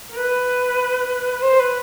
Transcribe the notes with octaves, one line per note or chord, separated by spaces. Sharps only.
A#4
B4
C5
B4